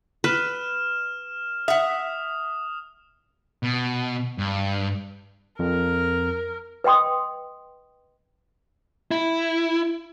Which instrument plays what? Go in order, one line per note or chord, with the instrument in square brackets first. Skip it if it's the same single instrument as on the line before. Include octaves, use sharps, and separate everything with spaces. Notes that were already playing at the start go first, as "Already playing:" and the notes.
[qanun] B4 [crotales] F6 E7
[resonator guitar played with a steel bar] E5 F#5 [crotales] D#6
[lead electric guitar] B2
G2
[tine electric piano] F2 [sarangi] A#4
[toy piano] B4 D#5 G5 C6 D#6
[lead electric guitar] E4